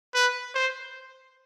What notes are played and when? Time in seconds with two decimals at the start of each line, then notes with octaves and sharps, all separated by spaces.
0.14 B4
0.54 C5